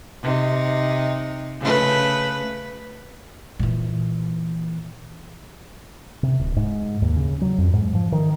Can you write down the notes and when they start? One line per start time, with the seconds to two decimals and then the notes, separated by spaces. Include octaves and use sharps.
0.23 C3 D#4
1.60 C#3 A3 B4
3.60 A#2 E3
6.23 C3
6.39 D1
6.56 G#2
7.02 D#2
7.16 C#3
7.41 F#3
7.58 F2
7.73 G#2
7.95 F3
8.12 D#3